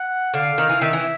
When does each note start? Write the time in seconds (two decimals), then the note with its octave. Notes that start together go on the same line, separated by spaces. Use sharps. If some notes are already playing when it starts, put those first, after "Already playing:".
Already playing: F#5
0.34 D3 F5
0.58 D#3
0.69 E3
0.81 D#3 E5
0.93 E3